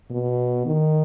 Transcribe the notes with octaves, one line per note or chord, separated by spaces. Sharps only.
B2
D#3